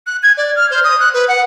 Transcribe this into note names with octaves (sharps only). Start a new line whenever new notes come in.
F#6
G#6
D5
F6
C5
D#6
F#6
B4
F#5